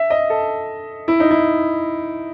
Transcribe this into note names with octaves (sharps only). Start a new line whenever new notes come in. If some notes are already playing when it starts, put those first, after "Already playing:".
Already playing: E5
D#5
A4
E4
D#4
E4